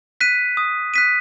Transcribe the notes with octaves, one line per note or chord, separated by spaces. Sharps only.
F#6 B6 D#7
D#6
F#6 B6 D#7